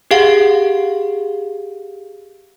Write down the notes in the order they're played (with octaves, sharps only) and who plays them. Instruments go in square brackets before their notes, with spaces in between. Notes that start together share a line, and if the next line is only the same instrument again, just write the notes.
[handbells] G4 G#4 F5 F#5